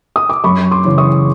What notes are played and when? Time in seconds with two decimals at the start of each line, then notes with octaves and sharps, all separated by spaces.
0.16 D#6
0.29 D6
0.44 F#2 B5 C#6
0.71 C6 D6
0.85 C#3 E3
0.98 C#6 D#6